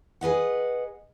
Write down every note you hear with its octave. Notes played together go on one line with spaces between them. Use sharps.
G#4 B4 D#5 F#5